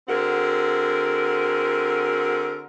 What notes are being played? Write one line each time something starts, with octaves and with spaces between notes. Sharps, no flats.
D3 C4 F#4 G#4 A#4